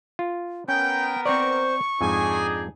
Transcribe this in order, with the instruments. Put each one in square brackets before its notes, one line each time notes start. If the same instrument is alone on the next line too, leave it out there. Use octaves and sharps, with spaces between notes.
[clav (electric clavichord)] F4
[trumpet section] B3 A#4 [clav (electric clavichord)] C#4 [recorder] G5 [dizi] G6
[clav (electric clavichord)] C4 D5 [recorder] C5 [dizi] C#6
[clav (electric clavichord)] F2 G#2 [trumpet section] D4 D#4 G#4 [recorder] G#5